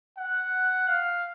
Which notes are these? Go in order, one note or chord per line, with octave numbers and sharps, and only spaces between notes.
F#5
F5